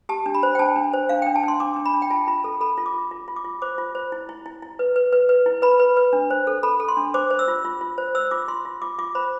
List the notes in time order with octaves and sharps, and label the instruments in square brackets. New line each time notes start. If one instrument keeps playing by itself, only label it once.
[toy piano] G4 A5
D4
B5
C5
G5
D4 A5
D4
C5
D4 F5
D4 G5
A5
D4 C6
D4 D6
D4
B5
D4
G5
F4 A5
F4 B5
A4
A4 B5
F4
D6
F4
F4
F4
D6
F4
C5 D6
F4
C5
E4
E4
E4
E4
B4
B4
B4
B4
E4
B4 B5
B4
B4
D4
C5
A4
A4 B5
A4
C6
D4
C5 D6
C5
E6
F4
F4
F4
C5
C5 E6
F4 D6
F4 C6
F4
F4 D6
F4 D6
C5 B5